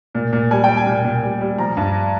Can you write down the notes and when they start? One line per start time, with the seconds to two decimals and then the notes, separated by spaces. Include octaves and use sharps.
0.15 A#2
0.33 A#2
0.51 G3 G#5
0.64 G3 G5
0.77 G#5
0.87 A#2
1.05 A#2
1.23 G3
1.41 G3
1.58 F3 A#5
1.77 G2